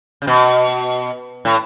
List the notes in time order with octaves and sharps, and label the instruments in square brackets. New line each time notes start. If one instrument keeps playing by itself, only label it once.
[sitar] C#3
B2
A2